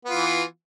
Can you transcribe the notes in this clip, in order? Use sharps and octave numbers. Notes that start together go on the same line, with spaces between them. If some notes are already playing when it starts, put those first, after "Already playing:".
E3 B3 F4